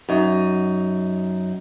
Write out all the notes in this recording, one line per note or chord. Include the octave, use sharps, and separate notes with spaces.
F#2 D#4